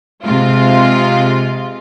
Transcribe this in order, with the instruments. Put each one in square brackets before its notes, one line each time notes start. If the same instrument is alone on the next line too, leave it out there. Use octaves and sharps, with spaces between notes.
[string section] C3 G#3 F4